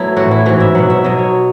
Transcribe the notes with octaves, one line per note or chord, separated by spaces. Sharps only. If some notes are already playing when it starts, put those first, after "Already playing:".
Already playing: F#3 A3 B3 E4
A2 E3 F#4
E4
G#2 E3 F#4
E5
B2 F#3 F#5
E5
B2 F#3 D#5
C#5